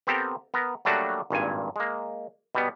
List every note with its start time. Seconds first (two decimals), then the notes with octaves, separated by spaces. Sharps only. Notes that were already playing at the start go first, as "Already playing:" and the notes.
0.07 B3 C4 G4 A4 A#4
0.54 B3 A#4
0.85 F#3 G3 A3 A#3 D4 F#4
1.30 G#1 G2 A#2 G#5
1.76 G#3 A#3
2.55 B2 G3 B3